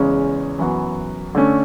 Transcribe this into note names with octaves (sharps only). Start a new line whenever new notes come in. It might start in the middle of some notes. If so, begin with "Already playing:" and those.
Already playing: E2 C#3 G#3 C#4
F#2 E3 B3 F#4
D3 A3 C#4